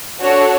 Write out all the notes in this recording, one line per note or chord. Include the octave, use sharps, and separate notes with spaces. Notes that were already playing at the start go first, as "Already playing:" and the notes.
D4 F#4 A4 C#5